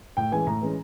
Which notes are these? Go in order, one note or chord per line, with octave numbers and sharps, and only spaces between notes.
A2 G5
E3 G#3 C#4 G#5
A2 A#5
E3 G#3 C#4